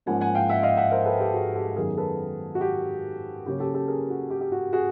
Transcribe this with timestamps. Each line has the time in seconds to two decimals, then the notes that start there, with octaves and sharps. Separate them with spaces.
0.06 G#2 F3 A#3 C#4 F#5 G#5
0.21 F#5 G#5
0.35 F5 G5
0.49 E5 F#5
0.63 D#5 F5
0.77 E5 F#5
0.91 A#4 C5
1.06 A4 B4
1.20 G4 A4
1.34 F#4 G#4
1.55 G4 A4
1.76 F#2 D#3 F#3 B3 G#4 A#4
1.97 A4 B4
2.55 F#4
2.61 G4
3.46 C#3 F#3 A#3 C#4 G4
3.60 G4 A4
3.74 G4 A4
3.88 G#4 A#4
4.10 F#4
4.30 G4
4.41 G4
4.52 F#4
4.73 F#4 G#4